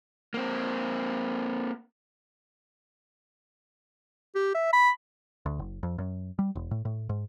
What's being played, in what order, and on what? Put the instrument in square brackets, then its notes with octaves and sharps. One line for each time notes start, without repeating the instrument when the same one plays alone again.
[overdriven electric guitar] A#3 C4
[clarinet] G4
E5
B5
[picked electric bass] D2
F#1
F2
F#2
G3
E1
A2
A2
G#2